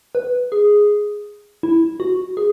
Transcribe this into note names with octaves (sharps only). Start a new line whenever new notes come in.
B4
G#4
E4
F#4
G#4